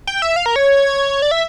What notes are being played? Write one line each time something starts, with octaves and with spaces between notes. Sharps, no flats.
G5
E5
F5
A#4
C#5
D5
E5